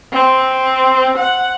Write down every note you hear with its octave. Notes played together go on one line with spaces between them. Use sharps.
C4
F#5